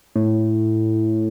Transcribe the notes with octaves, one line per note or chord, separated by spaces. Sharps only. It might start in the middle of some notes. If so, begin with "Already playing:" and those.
A2